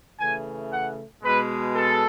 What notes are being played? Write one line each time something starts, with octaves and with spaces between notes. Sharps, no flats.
C#3 E3 A3 G#5
F#5
B2 G#3 B4
A4